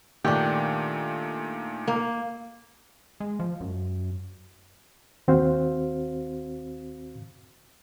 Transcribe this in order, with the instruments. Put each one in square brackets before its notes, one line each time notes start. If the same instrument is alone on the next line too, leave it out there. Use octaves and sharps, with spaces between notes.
[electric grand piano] A#2 D#3 A3 [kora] D4 G4
[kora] A#3
[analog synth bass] G#3
F3
F#2
[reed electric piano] D#2 C4 F#4 C5 F5